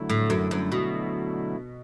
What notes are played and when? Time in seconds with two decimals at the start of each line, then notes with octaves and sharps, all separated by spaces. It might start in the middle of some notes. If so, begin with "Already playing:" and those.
Already playing: D3 F#3 A3 E4
0.10 A2
0.30 F#2
0.51 F#2
0.72 B2